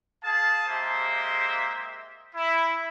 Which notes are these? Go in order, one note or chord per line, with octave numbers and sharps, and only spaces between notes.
G#4 F5 A5
G#3 A#3 G4 C5 E5
E4